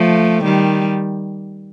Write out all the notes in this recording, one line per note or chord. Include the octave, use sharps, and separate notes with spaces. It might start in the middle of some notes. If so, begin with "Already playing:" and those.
Already playing: F3 A3
D#3 G3